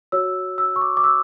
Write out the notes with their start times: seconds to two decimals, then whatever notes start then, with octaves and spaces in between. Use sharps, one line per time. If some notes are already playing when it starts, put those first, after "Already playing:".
0.12 F#4 C#5 E6
0.58 E6
0.76 C#6
0.82 D6
0.97 D6
1.04 E6